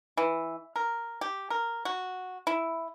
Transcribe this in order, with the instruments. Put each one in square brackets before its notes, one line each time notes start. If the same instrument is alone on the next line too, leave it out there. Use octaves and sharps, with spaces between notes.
[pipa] E3
A#4
G4
A#4
F#4
E4